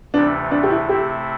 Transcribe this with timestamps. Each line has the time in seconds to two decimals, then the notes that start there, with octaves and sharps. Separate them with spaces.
0.13 D2 C3 E3 A3 D4
0.51 D4
0.63 G4
0.70 E4
0.89 C3 A3 C4 E4 G4